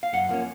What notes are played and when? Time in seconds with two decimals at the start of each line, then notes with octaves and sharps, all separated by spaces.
0.03 F5
0.13 F#2 F#5
0.29 F3 A#3 C#4